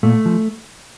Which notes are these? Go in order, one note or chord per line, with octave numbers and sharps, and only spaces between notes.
A#2 A3
F3